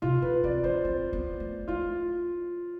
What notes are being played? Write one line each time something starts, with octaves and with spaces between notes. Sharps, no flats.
C3 F4
D3 B4
C4 D5
D4 C5
C4
B3
A3
A3 F4